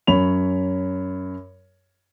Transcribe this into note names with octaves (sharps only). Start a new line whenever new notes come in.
F#2 C#5 B5 F7